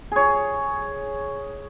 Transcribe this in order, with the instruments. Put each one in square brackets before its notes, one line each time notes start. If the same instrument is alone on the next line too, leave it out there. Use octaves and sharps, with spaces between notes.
[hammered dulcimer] G#4 C#5